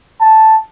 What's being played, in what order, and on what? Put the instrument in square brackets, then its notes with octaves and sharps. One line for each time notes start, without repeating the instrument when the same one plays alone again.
[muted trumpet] A5